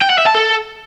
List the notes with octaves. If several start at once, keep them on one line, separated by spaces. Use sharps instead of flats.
G5
F#5
E5
A5
A4